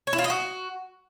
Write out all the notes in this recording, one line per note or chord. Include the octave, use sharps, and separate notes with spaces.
C#5
E4
F4
D#5
F#4